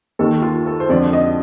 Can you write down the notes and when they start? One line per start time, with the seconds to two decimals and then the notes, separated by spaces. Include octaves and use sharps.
0.19 D#2 D#3 A4
0.42 F4
0.66 A4
0.80 C5
0.89 F2 D3 F3 D5
1.13 D#5